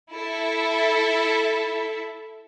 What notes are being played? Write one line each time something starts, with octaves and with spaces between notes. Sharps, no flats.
E4 A4 E5